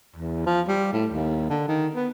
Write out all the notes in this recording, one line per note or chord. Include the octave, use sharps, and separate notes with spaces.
E2
F3
G3
A2
D#2
D3
D#3
B3